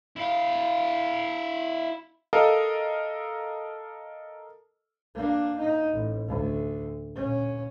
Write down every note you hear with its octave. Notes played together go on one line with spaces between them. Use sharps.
E4 F5
A4 A#4 D#5 F5
A#3 D4
D#4
A1
D2
A#2 C#4